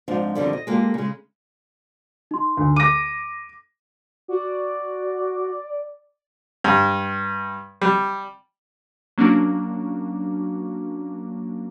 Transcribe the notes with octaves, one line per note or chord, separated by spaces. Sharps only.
G#2 F3 C4 D4 C5
F2 B2 D3 D#3 G3
D#5
G#3 A#3 F4 G4 A4
C#3 G#3
D#4 C6
D2
D6 A#6 D#7
F#4 D5
G2
G3
F#3 A#3 C#4 D4 F#4